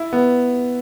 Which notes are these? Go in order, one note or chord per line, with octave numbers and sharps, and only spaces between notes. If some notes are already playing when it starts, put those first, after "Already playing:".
Already playing: E4
B3